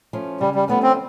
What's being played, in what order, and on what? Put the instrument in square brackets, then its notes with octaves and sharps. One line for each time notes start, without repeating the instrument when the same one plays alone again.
[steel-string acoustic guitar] F3 A3 C#4
[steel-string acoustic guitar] C#3 [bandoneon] G3
[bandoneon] G3
[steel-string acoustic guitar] F3 A3 C#4 [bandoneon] B3
[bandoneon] C4